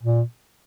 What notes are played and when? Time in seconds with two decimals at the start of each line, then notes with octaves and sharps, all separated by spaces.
0.03 A#2